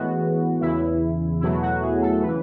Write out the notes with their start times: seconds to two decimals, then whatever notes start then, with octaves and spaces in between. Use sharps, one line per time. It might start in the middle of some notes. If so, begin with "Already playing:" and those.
Already playing: A2 E3 G#3 B3 F#4
0.60 E2 C#3 E3 E4
1.41 E2 B2 F#3 A3 E4
1.61 F#4
1.81 G#4
2.02 A4
2.22 C#3 E3 B4